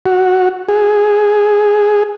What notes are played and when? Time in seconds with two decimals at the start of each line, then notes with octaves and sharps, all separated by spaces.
0.06 F#4
0.69 G#4